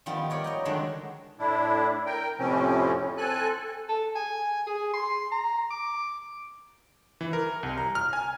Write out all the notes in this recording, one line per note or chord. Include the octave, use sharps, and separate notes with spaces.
D#3 F3 G3 B3 F4
A#4 C#5 D5
D#5 G5 A#5
D3 D#3 F#3 G#3 D4
A2 D4 E4
A#4 G5
F2 A2 C3 F3 C4 C#4
C4 A4 G#5 F#6
A4
G#5
G#4
C6
A#5
D6
E3
A#4
C2
A#5
F6
G#5